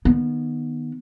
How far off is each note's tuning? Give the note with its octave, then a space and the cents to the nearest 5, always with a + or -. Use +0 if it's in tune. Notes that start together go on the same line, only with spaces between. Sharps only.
D#3 -20 B3 -20